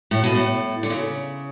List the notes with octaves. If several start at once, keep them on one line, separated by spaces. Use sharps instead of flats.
A2
B2
A2
D3
C#3